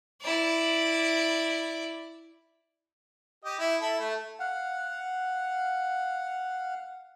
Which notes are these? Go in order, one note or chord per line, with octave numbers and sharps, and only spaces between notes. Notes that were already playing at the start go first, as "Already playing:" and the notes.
E4 D5
G4 D#5
E4
E4 A4
A3
F5 F#5